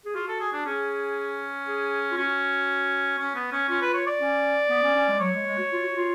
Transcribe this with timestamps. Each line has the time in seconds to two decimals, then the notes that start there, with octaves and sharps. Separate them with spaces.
0.05 G#4
0.15 F4 F#4
0.28 A4
0.40 G#4
0.53 D4
0.66 C#4 G#4
1.68 G#4
2.12 F4
2.17 C#4 F#4
3.19 C#4
3.35 B3
3.52 C#4
3.69 C#4 F4
3.82 B4
3.94 C#5
4.07 D5
4.20 C#4
4.70 B3
4.83 C#4
4.96 C#4
5.08 G#3
5.20 F#3 C#5
5.34 G#3
5.47 G#3
5.58 F#4
5.72 F4
5.84 F#4
5.96 F4